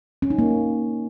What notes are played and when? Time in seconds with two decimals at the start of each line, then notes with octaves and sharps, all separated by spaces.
0.22 C#4
0.30 D#4
0.39 A#3